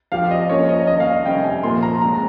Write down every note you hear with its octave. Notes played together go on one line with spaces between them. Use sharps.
F3 C4 G4 F5
D#5
F3 A#3 C#4 C#5
D#5
D#3 A#3 C#4 D#5
F5
D#5
F2 C3 G3 C#4 G5
G#5
A#2 F3 A#3 C6
A#5
A#2 G#3 C4 A#5